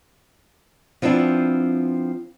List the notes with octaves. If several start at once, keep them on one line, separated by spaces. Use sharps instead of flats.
F3 B3 C4 D4 E4